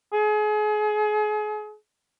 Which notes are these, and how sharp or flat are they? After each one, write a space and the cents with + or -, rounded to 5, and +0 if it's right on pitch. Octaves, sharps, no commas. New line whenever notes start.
G#4 +35